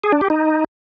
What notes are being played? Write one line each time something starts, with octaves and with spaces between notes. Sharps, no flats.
G#4
D4
G4
D#4